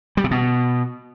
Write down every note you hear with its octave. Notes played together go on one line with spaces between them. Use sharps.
G3
C3
B2